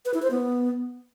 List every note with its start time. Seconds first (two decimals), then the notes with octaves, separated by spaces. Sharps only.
0.05 B4
0.14 E4
0.22 C5
0.31 B3